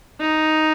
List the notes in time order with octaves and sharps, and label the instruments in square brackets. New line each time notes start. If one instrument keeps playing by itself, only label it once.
[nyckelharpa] D#4